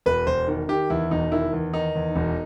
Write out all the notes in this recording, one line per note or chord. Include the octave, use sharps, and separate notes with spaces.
E1 B4
E1 C5
D#3
D#3 G4
E2 E4
E1 D#4
D#3 E4
E2
D#3 D#4
E2
E1